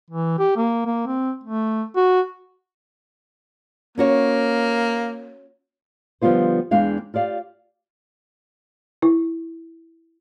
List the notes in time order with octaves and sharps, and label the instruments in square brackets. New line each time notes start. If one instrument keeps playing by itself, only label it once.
[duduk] E3
G4
A#3
A#3
C4
A3
F#4
[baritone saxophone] A#3 [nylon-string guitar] C#4 F#4 C#5
[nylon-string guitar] D3 F3 G3 B3 F4 C5
E2 E3 G#3 D4 F5 G5
F4 G4 D5 F5
[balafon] E4